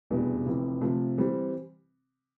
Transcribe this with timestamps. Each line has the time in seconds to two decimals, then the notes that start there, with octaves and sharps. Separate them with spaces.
0.10 F1 E2 B2 G3 D4
0.46 F1 F2 E3
0.81 C3 F3 A3
1.17 E3 G3 C4